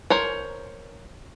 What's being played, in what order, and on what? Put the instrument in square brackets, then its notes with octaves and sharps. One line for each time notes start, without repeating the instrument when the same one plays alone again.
[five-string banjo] A#4 C5 C#5